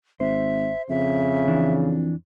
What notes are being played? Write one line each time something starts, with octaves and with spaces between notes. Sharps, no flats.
G#1 C5 E5
F2 C#3 E5
E3 D4